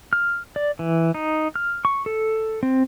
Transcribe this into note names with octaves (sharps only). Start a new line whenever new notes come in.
F6
D5
E3
D#4
F6
C#6
A4
C4